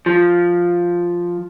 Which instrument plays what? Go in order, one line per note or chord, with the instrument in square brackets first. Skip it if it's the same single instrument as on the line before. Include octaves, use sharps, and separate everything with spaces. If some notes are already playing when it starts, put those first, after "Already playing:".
[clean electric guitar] F3